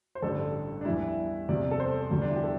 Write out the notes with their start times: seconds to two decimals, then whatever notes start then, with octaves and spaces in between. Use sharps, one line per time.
0.15 C5
0.23 A1 G2 D3 G3 A4
0.81 D4
0.85 E2 E3 G3 E4
1.49 E2 C3 G3 D5
1.71 A4
1.80 C5
2.11 E2 D3 G3
2.22 D4
2.29 E4
2.36 G4
2.44 A4